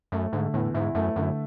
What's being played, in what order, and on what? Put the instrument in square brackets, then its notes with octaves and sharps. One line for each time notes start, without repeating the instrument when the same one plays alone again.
[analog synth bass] F#2 [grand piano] A3
[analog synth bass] G#2 [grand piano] D3
[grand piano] E2 [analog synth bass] A2
[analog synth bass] G#2 [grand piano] E4
[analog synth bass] F#2 [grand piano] A3
[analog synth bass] F#2 [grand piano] D3